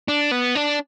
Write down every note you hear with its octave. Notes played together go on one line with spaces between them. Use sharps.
D4
B3
D4